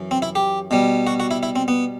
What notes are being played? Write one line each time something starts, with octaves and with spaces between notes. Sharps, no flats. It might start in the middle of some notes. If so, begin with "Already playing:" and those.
Already playing: F#2 E3
C4
E4
G4
B2 G3
F#4
F#4
E4
E4
C4
B3